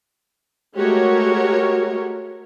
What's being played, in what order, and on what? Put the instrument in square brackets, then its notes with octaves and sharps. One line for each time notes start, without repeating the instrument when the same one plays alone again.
[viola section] G#3 A3 F#4 G4 A#4 C#5